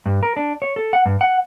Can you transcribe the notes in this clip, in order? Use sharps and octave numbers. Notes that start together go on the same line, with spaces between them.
G2
A#4
D4
C#5
A4
F#5
G2
F#5